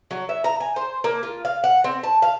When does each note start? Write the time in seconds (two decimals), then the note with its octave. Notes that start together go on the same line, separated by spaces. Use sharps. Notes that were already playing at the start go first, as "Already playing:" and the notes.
0.11 F#3
0.29 E5
0.44 A#5
0.60 G#5
0.76 C5
1.04 A#3
1.23 F4
1.45 F5
1.64 F#5
1.84 C4
2.03 A5
2.22 F5